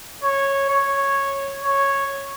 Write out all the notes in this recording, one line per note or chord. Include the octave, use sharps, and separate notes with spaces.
C#5
C#5
C#5